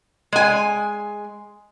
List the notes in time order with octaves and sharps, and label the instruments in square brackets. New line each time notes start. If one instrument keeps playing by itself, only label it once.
[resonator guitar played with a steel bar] G#3 G#5